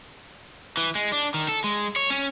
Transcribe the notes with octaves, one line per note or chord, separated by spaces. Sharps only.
E3
G#3
D4
D#3
A4
G#3
C#5
C#4